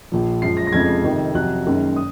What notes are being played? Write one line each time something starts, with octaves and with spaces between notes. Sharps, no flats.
A#1 A#2 F3
F#1 F#2 F3 G#3 C7
A#6
A#6
F1 F2 C#3 F3 G#3 G#6
F2 C3 D#3
F2 C3 F#3 F#6
F#1 F#2 D#3 G#3
D#6